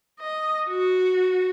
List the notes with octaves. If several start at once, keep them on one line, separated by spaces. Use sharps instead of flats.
D#5
F#4